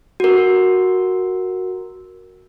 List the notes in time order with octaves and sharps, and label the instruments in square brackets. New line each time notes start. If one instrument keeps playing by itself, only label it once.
[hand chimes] F#4 A#4